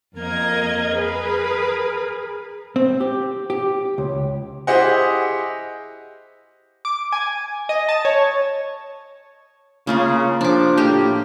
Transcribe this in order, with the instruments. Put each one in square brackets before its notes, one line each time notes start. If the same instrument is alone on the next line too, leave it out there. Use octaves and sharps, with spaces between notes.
[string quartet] F2 A#3 A#4 D#5 G#6
G#4 A#4 B4
[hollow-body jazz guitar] C4
G4
G4
C#2
[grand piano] E4 G4 G#4 C5 D#5 F#5
[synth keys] D6
G#5
D#5
A5
C#5
[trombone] C#3 [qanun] A#3 F4 G#4
[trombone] F3 [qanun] D4 D6
[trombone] A2 [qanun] A#3 G4